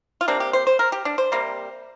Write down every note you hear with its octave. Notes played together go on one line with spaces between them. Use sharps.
F4
C3 A#3 D4
G4
C5
C5
A#4
G4
D4
C5
C3 G3 A#3